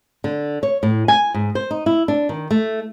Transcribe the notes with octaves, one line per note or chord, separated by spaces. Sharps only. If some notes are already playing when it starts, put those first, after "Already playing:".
D3
C#5
A2
G#5
G#2
C5
D#4
E4
D4
D#3
A3